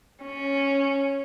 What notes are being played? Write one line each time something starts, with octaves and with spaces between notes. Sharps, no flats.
C#4